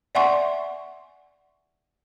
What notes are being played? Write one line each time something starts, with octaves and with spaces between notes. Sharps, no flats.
D5 E5 F#5 G#5 C6 C#6